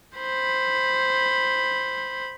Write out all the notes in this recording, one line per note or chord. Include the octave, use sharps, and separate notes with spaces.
C5 B5